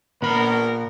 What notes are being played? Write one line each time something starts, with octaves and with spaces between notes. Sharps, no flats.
A#2 B3 A#4 B5